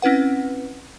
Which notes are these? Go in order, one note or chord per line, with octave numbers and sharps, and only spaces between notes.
C4 C#4 E4 B4 F#5